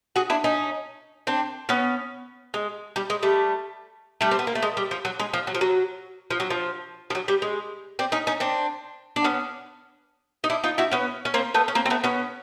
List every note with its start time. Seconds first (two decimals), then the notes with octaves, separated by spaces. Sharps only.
0.16 F#4 G#4
0.30 D4 E4
0.44 C#4 D#4
1.27 C4 D4
1.69 B3 C#4
2.54 G#3
2.96 G3
3.10 G#3
3.23 G3 A3
4.21 G3 A3
4.31 C4
4.39 B3
4.47 A#3
4.55 A3
4.62 G#3
4.77 G3
4.91 F3
5.05 F#3
5.20 G#3
5.33 F3
5.47 F#3
5.55 F3
5.61 F#3
6.30 F3
6.40 F#3
6.50 F3
7.10 F3
7.15 F#3
7.28 G3
7.42 G#3
7.99 C4 D4
8.12 C#4 D#4
8.27 C#4 D#4
8.40 C4 D4
9.16 D4
9.24 B3 C#4
10.44 D#4
10.50 D4 E4
10.64 D#4 F4
10.78 E4 F#4
10.91 B3 C#4
11.25 C#4
11.34 A#3 C4
11.54 A3 B3
11.68 C#4
11.75 A#3 C4
11.86 C4
11.90 A3 B3
12.04 B3 C#4